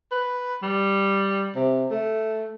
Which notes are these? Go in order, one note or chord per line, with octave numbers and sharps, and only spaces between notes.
B4
G3
C3
A3